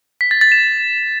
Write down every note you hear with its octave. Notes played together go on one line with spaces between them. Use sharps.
B6
A6
A6
E7